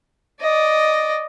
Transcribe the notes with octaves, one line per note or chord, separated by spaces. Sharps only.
D5 D#5